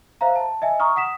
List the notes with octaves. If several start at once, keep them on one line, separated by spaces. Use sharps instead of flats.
C5 E5 F5 A#5
A5
D#5 E5 G#5
A#5 C#6 D#6 F6
F#5 D#6 B6 E7